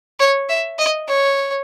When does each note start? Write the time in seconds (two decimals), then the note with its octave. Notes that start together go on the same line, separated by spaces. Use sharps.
0.20 C#5
0.49 E5
0.79 D#5
1.08 C#5